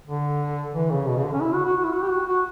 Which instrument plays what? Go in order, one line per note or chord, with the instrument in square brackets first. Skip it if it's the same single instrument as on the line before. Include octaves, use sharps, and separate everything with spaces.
[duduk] D3
E3
C#3
B2
C#3
D3
C#4
E4
F#4
F#4
F#4
E4
F#4
G4
F#4
F#4